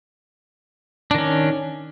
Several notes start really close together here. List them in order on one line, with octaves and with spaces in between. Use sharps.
D4 D#3 C#4